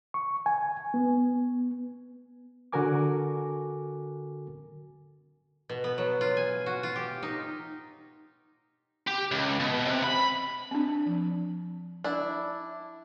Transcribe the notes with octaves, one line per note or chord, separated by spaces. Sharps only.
C#6
G#5
B3
D3 F#4 A4 A#4 G#5 D6
B2
B3
F#3
F4
G#5
F#4
F4
G4
D#4
G4
C#2
B2
C3
B5
C4 D4
F3
D4 E4